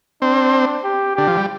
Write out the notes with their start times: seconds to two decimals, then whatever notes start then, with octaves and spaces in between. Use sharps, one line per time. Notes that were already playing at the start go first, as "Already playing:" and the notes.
0.22 C4 D4
0.83 G4
1.15 D3 G4
1.27 F3
1.37 G3